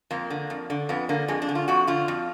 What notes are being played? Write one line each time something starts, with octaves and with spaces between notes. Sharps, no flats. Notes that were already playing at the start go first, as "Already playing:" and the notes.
F2 A#3
D3
F2
D3
F2 B3
D3 A#3
F2 G#3
D4
D3
F4
F2 F#4
D3 F4
F2